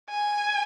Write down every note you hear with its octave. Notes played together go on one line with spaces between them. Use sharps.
G#5